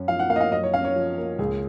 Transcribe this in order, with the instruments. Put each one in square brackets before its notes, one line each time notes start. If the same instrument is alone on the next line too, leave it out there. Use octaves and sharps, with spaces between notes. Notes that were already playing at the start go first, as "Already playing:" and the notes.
Already playing: [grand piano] F#2 C#4
[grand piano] F3 [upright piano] F5
[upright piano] F#5
[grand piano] A#3 [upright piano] F5
[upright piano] D#5
F5
[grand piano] F#2 [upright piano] D#5
[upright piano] C#5
[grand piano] C#4 [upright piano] F5
[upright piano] C#5
[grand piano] F3
A#3
[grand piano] C#2 [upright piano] G#4